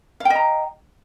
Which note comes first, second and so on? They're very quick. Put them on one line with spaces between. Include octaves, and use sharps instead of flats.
F5 G5 D#5 A#5